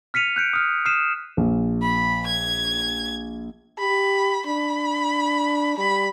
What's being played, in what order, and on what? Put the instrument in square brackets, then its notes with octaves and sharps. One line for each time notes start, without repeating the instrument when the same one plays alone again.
[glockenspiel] F6 B6 C#7 D#7 F7
F#6 G6 C#7 D7
D#6 F6
D#6 F6 C7 D#7 E7
[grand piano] A#1
[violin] B5
G#6
[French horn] G4 [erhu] B5
[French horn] D4 [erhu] B5
[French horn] G3 [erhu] B5